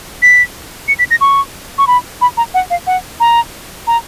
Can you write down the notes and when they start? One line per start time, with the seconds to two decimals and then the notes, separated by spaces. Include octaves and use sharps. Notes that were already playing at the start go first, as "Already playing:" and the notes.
0.22 B6
0.88 C#7
0.99 B6
1.11 A#6
1.21 C#6
1.78 C#6
1.87 B5
2.21 B5
2.37 A#5
2.54 F#5
2.70 F5
2.87 F#5
3.20 A#5
3.87 A#5